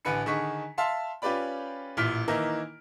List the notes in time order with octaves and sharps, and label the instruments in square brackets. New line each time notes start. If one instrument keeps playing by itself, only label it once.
[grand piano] A1 D3 B4 G#5 B5 C#7
D3 D#3 G#4 C#6 B6
E5 F5 A5 C6
C#4 F4 G4 B4 D5 B5
A1 A#2 E4 F6 B6
D#3 E3 A#3 D#4 E4 A#4